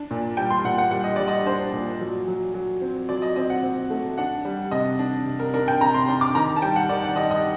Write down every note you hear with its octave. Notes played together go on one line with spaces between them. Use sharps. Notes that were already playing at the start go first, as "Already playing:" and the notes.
Already playing: D4
A#2
G3 G5
C6
A#2 F#5
F#5
G3 F#5
D#5
G3 D5
D#5
D4 C5
A#2
F#3
F#3
F#3
C4
F#3 D5
D#5
C4 D#5
F#5
C4
A3
D4 F#5
G3
C3 D#5
D4
C3
A#4
D4 A#4
G5
C3 A#5
C6
D4 C6
D6
D#3 A#5
A5
G3 G5
F#5
D#3 D5
F#5
G3 D#5
D#5